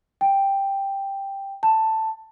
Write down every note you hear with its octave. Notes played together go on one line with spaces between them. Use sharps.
G5
A5